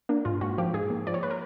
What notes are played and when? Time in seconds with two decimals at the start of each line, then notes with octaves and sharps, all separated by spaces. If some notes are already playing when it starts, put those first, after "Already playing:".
0.09 A#3 D4
0.25 G#2 F4
0.41 G#2 F#4
0.58 F3 G4
0.73 G#2 G#4
0.90 A#3
1.07 F3 D5
1.14 C#5
1.23 B4
1.31 A#4